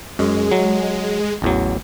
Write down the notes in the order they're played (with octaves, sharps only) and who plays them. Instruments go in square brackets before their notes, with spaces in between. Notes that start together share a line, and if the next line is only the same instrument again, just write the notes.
[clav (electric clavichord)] F#2 [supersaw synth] G#3
[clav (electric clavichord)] F#3
A1 E2 F#3